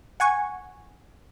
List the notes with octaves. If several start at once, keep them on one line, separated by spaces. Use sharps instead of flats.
F#5 G#5 C#6